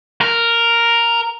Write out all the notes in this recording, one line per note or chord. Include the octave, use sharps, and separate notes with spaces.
A#4